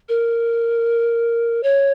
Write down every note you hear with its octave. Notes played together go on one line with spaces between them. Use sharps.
A#4
C#5